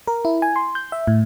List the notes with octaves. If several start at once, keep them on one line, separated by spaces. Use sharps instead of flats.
A#4
E4
G#5
C6
G6
E5
A2